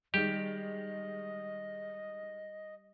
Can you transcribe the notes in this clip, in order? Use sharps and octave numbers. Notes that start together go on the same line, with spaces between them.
D#3 G3 G#3 G4 D#5